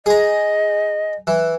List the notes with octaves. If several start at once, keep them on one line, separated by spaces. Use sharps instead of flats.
G#4 D#5 A#5
E3